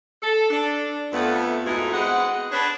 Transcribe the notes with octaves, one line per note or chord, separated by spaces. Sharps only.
A4
D4
F2 A3 B3
D2 G#2 C4 D#4 E4 F#4
G#3 B3 C4 D#5 F#5
D4 B4 C#5